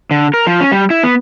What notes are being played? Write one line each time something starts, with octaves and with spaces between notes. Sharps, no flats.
D3
A#4
F3
C#4
G3
E4
B3